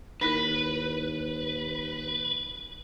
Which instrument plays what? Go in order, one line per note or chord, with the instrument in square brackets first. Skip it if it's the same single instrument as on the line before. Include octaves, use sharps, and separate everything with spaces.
[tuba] D#2 [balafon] D#4 E4 A#4 [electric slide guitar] B4